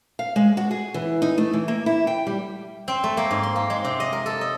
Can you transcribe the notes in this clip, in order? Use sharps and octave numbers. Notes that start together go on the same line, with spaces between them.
F5
G#3
F#4
G#4
E3
D#4
A3
E3
A#3
E4
G5
G3
C4
A3
A#3
G#2
C6
A#3
G#3
C3
D#5
A#4
A4
D#5